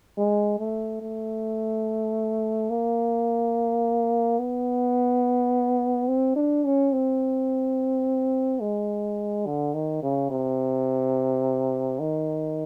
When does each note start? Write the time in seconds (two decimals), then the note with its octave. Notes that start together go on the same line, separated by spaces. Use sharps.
0.17 G#3
0.59 A3
1.02 A3
2.70 A#3
4.39 B3
6.08 C4
6.36 D4
6.65 C#4
6.93 C4
8.61 G#3
9.46 D3
9.74 D#3
10.03 C#3
10.31 C3
12.00 D#3